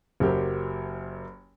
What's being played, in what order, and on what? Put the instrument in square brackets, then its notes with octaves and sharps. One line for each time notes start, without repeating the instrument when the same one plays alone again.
[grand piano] F#1 F#3 G4 A#4 C5